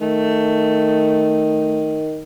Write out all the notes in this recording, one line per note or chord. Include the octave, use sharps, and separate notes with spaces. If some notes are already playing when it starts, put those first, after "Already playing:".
D#3 A3